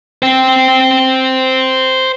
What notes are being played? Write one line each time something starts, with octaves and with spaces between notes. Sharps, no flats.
C5 G5